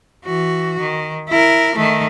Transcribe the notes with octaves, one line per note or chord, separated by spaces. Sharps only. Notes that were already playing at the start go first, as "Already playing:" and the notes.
E3 F#4
D#3
E4 A#4
D#3 A3